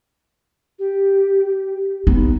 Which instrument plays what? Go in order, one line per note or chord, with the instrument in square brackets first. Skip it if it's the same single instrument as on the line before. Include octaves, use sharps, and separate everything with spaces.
[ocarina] G4
[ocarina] B3 [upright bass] D#4